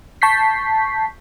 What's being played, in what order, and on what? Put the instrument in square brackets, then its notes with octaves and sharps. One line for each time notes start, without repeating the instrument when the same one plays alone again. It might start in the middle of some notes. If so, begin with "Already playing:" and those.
[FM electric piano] A5 C#6 G6 B6 C7